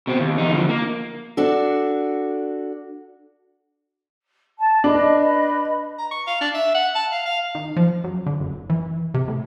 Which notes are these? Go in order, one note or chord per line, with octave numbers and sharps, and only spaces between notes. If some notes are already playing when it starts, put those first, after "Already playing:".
B2 C4
D#2
E2 D#4
D3 F3
A#3
D4 F#4 A4
A5
D4 B4 D#5 B5
A#5
C#6
F5
D4
E5
F#5
A5
F5
F5
D#3
F3
F#2
D3
F#1
E3
C3
A2